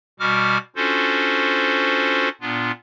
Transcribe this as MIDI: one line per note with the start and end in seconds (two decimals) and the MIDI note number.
0.20 0.58 47
0.20 0.58 55
0.20 0.58 66
0.20 0.58 86
0.20 0.58 89
0.76 2.29 61
0.76 2.29 62
0.76 2.29 65
0.76 2.29 66
0.76 2.29 69
0.76 2.29 72
2.41 2.71 46
2.41 2.71 59
2.41 2.71 62
2.41 2.71 65